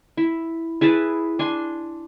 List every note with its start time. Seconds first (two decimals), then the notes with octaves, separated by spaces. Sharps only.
0.17 E4
0.81 E4 G#4 B4 A5
1.39 D4 G#5 C6